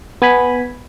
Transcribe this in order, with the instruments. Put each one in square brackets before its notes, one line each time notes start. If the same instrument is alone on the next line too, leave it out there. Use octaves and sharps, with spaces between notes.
[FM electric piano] B3 G#5 B5